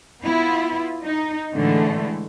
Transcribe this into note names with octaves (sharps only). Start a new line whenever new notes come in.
B3 E4 F4
D#4
A2 D3 E3 G#3 A3